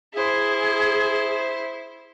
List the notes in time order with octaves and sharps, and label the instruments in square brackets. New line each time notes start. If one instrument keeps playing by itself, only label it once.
[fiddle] E4 C5 [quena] G#4